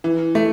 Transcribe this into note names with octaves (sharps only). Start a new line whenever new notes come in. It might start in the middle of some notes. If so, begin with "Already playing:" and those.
E3
A3